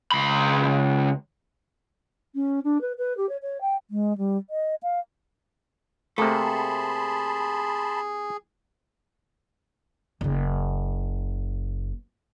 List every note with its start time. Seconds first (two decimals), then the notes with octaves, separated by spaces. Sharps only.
0.12 C#2 B5
2.35 C#4
2.64 D4
2.81 B4
2.98 B4
3.17 G4
3.29 C#5
3.42 C#5
3.61 G5
3.90 G#3
4.18 G3
4.50 D#5
4.83 F5
6.18 C3 A3 A#3 G#4 A5 B5 C6
10.21 F#1 C#3